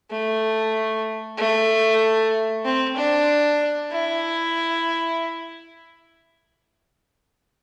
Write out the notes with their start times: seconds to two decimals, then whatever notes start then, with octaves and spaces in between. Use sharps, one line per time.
0.10 A3
1.37 A3
2.65 C4
2.96 D4
3.91 E4